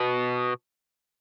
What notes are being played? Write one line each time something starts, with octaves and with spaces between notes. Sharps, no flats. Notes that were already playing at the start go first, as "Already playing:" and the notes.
Already playing: B2